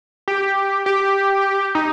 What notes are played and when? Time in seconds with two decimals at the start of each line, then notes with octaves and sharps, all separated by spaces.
0.28 G4
0.86 G4
1.75 D#4